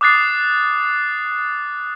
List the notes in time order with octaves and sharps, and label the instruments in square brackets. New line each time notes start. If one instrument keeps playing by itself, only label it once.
[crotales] D6 D#6 F#6 A6 C7